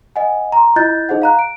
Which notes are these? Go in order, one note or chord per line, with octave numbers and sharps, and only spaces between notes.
D#5 F#5 G#5
A#5 C6
E4 F4 D#5 F#6 G6 A6
D#4 G#4 C5 D#5 F#5
F5 A#5 F#6
D7